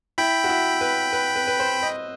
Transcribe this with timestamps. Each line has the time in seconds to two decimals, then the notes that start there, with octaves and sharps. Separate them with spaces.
0.18 E4 G5 B5
0.44 F#4
0.49 E4
0.81 B4
1.13 B4
1.36 B4
1.47 B4
1.60 C5
1.83 D#5